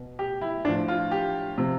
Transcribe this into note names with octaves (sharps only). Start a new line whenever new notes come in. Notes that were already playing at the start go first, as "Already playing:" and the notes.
Already playing: B2
G4
E4
A2 F3 D4
F4
G4
C3 F3